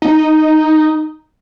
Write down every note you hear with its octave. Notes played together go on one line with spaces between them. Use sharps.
D#4